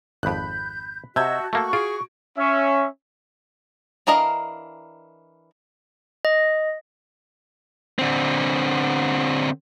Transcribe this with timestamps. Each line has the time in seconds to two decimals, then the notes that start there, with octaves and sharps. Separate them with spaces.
0.23 G#1 F2 B5 F#6 G6
1.16 C3 F#4 D#5 E5 A5 G6 G#6
1.53 A3 A#3 F#4 A4 C#6
1.73 F4 F#4 G#4 D7
2.38 C#4 E5
4.07 E3 D4 A#4 D#5 F5
6.25 D#5
7.99 D3 C4